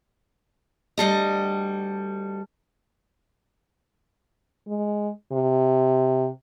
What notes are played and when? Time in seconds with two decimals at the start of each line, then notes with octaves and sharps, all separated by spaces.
0.97 D2 G3 A4 D#5
4.67 G#3
5.32 C3